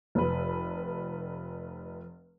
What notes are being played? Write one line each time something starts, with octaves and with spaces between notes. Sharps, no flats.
F1 B4